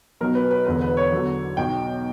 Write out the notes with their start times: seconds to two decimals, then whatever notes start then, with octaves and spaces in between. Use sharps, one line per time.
0.21 B1 B2 F#3 A#4
0.35 B4
0.51 B4
0.65 E1 E2 D3 B4
0.81 B4
0.97 C#5
1.12 E2 D3 F#3
1.57 B1 B2 F#3 G5